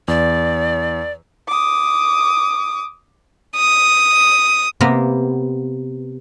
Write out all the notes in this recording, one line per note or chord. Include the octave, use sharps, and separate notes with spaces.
E2 D5
D6 D#6
D#6
C3 A#3 B3 A#4